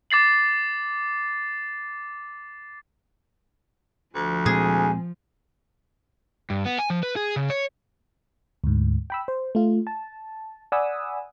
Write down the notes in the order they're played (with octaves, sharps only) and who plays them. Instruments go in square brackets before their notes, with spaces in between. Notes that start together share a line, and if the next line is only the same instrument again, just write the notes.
[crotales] D6 A6 C7 F#7
[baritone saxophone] D2 [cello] F3
[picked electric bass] A#2 G#3 C4 [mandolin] G#4
[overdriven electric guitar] G2
B3
G#5
F3
B4
G#4
C#3
C#5
[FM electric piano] D2 G#2
G5 B5 E6
C5
A3 F4
A5
D5 F#5 G#5 B5 D#6 E6